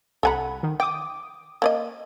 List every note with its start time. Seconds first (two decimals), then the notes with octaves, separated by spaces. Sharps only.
0.23 C2 A4 F#5 G#5 A#5 B5
0.63 D#3
0.80 G5 D6 D#6
1.62 A#3 D5 D#5